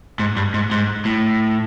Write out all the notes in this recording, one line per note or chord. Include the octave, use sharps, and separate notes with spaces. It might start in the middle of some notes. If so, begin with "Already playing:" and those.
G#2
G2
G#2
G#2
A2